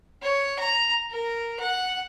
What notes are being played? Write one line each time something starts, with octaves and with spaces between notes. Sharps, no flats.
C#5
A#5
A#4
F#5